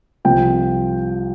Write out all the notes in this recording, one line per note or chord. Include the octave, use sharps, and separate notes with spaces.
C2 C3 F3 G5